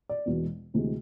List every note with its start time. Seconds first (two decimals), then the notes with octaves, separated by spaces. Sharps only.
0.09 D5
0.26 E1 E2 B2 G#3 B3
0.74 D2 C3 E3 G#3